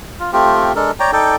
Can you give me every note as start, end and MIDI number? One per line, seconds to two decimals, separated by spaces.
0.20 0.31 65
0.33 0.73 57
0.33 0.73 60
0.33 0.73 65
0.33 0.73 67
0.76 0.91 56
0.76 0.91 62
0.76 0.91 69
0.76 0.91 70
1.00 1.11 73
1.00 1.11 74
1.00 1.11 79
1.00 1.11 82
1.13 1.36 63
1.13 1.36 69
1.13 1.36 74
1.13 1.36 79